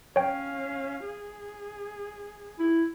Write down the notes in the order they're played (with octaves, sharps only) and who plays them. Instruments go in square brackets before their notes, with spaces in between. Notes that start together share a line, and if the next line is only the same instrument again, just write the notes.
[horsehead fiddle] C#4 F5 [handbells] C#5 G5
[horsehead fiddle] G#4
[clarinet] E4